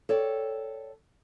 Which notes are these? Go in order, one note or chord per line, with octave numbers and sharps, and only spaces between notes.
A4 C#5 D5 G5